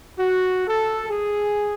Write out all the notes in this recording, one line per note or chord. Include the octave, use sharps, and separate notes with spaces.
F#4
A4
G#4